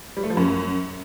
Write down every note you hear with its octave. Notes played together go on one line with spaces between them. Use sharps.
G3
A3
F3
F#2